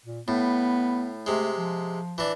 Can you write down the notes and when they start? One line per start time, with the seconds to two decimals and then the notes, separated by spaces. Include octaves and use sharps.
0.06 A#2
0.28 A2 B3
1.26 C3 G#3 A3
1.58 F3
2.18 E3 D4